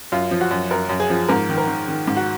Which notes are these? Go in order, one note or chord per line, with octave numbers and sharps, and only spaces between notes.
F#2 F4
F3
F#4
F#2
F#2 A#4
F#2
G#4
F3
G#2 A#4
D#3
A#4
D#3
D#3
G#2
F#4